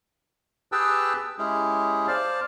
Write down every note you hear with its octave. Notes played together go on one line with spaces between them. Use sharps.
G4 G#4 B4 G5 A5 E6
G#3 C#4 E4 G4 G#4
C5 D5 F5 A5